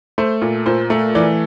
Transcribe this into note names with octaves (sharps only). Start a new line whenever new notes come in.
A3 C5
A#2
A#2 C5
A3
E3 D5